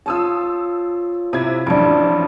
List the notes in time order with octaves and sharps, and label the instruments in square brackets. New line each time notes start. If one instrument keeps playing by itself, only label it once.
[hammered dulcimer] F4 C5 C#5 [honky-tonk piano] A5 D#6 E6
[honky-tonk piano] C3 G#6 [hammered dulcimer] E4
[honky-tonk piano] A1 F2 [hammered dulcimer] D4 D6